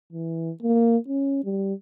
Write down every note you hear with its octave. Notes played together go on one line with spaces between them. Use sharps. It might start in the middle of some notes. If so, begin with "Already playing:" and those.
E3
A#3
C#4
G3